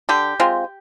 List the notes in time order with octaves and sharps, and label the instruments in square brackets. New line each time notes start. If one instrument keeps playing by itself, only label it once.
[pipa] D3 G4
G#3 C4 F4